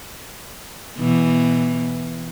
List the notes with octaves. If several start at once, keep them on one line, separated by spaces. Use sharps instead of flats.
B2 E3